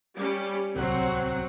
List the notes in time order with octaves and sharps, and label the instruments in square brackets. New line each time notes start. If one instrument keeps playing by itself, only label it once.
[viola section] G3 C#4
[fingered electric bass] D1 C2 [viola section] F#3 C4 F#5